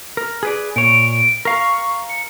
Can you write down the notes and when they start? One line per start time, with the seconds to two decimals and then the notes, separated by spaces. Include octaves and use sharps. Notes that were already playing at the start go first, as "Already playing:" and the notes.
0.17 A#4
0.43 G#4 B4 D5
0.76 A#2 C#5 D7
1.45 A#4 F5 C#6
2.09 C#7